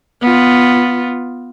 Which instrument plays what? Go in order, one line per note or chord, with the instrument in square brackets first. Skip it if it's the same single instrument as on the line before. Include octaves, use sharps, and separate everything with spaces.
[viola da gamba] B3 F4